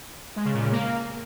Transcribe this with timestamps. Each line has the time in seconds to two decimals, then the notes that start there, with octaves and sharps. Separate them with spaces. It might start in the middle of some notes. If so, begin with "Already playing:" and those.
0.36 G#3
0.45 C#3
0.54 A#2
0.63 C#3
0.72 A#3